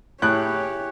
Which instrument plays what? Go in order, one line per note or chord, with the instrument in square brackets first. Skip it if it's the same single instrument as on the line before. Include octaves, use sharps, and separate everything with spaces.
[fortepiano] A2 [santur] E4 G#4 E6 [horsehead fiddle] G4 C#5 [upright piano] F#6